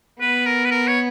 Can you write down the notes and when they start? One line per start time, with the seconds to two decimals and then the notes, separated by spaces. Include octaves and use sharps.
0.21 B3 B4
0.46 A#4
0.65 B4
0.71 A#4
0.87 C#5